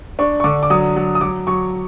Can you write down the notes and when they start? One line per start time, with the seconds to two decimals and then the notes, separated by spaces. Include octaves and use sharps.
0.19 D4 C#6
0.40 C#6
0.44 D3 D6
0.63 D6
0.70 F#3 D#6
0.96 F#3
1.15 D#6
1.21 F#3 D6
1.47 F#3 C#6